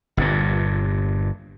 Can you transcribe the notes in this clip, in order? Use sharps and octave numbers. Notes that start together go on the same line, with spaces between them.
G1 G2 A#2